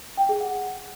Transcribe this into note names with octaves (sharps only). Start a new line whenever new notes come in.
G5
G#4
F#5